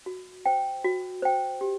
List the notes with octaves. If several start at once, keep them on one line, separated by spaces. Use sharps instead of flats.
F#4
C5 G5
F#4
C5 G5
G4